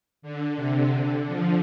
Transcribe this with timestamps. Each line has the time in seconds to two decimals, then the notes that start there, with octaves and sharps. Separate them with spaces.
0.22 D3
0.56 C3
0.91 D3
1.26 F3